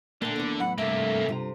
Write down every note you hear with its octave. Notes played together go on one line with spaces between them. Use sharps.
A#2 D3 A3 A#3 A#4 A5
E2 E3
A2 F#3 F#5 B5
G2 C3 A3 A#3 E5
G2 C3 F4 A#5